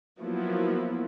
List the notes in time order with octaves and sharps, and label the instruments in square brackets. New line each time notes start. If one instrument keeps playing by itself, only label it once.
[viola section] F3 F#3 A#3 B3 E4